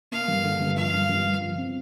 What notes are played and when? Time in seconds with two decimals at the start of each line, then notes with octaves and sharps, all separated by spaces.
0.12 A#3 F5
0.28 G2
0.44 D3
0.60 G2
0.76 F3 F5
0.93 G1
1.09 G2
1.24 G1
1.41 F3
1.57 C4